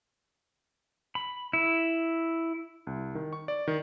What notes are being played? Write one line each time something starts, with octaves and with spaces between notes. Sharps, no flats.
B5
E4
C2
D#3
C#6
D5
D#3